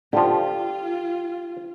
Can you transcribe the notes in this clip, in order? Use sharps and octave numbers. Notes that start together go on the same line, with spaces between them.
D3 F3 F4 G4